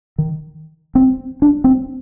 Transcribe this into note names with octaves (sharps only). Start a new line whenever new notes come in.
D#3
C4
D4
C4